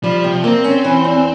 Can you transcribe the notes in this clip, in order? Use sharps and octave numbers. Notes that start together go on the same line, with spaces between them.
F3 G3
C3
A#3 C4
C#4
E3
E2